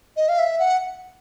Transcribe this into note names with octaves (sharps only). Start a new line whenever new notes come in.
D#5
F5
E5
F#5